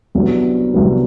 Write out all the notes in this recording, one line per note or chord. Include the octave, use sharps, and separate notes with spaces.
C2 C3 F#3 B3 D4
C2 C3 F#3 B3 D4